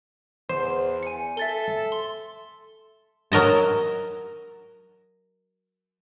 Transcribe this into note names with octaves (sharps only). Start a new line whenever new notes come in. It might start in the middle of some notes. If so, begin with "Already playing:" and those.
E2 C5
G#5 C#7
A4 E5 A6 G7
C6
F#3 A#4 D#5 A5